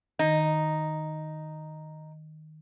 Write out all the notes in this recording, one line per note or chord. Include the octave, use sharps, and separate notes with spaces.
D#3 D#4